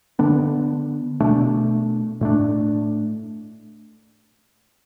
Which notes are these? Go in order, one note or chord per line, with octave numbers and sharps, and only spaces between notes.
D3 B3 D4
B2 A3 D4
A2 A3 D4